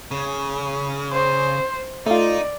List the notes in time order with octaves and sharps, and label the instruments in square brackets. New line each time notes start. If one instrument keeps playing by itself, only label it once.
[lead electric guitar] C#3
[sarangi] C5
[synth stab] A3 F4 [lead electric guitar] D#4 [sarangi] D5